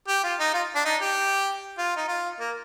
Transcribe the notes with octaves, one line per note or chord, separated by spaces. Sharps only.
G4
F4
D#4
F4
D4
D#4
G4
F4
D#4
F4
A#3